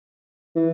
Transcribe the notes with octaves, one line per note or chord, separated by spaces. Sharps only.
E3